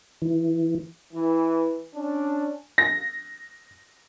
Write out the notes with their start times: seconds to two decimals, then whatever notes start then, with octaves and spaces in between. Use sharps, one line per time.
0.22 E3
1.13 E3
1.95 C#4 D4
2.78 A#6